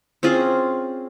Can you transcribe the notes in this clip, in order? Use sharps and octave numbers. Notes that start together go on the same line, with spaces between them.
C4 C#4 F4 G#4